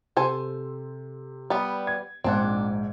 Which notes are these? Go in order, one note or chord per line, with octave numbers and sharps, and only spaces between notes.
C3 A4 C5 G#5
G3 B3
G#6
A#1 G#2 C4 D4 F#5